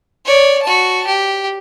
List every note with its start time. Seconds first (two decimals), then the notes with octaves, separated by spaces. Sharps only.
0.25 C#5 D5
0.63 F#4 A5
1.07 G4